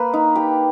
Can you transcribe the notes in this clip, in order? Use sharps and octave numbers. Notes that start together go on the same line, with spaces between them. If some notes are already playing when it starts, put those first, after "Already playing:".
Already playing: A#3 B4
D#4
G4